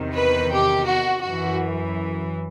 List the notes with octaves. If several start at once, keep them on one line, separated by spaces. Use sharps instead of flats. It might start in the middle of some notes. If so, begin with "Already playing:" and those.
Already playing: E2 C3 D#3
B4
G4
F#4
F#2 E3 F#4